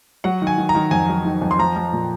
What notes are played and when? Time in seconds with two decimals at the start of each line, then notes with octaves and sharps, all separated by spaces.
0.24 F#3 F#5
0.42 D#3
0.47 G#5
0.58 D#3
0.69 A#5
0.75 D#3
0.91 F2 G#5
1.09 F#3
1.25 D#3
1.42 F2
1.51 C6
1.59 F3 A#5
1.76 F3
1.93 A#2